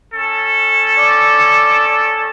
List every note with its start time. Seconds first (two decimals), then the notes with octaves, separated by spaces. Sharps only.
0.14 C#4 A4
0.99 D5